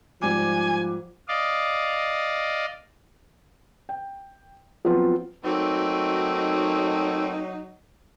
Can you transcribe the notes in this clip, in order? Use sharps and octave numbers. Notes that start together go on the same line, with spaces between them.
G#2 F3 G3 G#5 D6
D5 D#5 F5
G5
F3 F#3 B3 C4 F4 B4
F#3 A3 A#3 C4 D#4 F#4